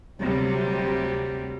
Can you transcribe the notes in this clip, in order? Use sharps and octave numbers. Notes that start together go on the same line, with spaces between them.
D2 C3 F#3 G3